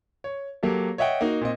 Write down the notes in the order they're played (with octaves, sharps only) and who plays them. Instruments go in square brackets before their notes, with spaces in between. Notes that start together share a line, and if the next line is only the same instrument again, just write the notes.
[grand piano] C#5
F#3 A#3 G4 A4
C#5 D#5 E5 F#5 G5
A#3 D#4 F#4
A#2 C4 D#5